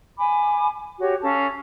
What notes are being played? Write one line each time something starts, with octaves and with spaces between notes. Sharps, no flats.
G#5 B5 D6
F#4 G4 C#5
C#4 A4 F5 A5